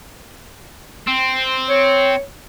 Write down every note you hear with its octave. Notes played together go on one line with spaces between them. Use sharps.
C4
C#5